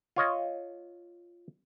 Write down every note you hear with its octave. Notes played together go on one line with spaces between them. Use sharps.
F4 C#5 D#5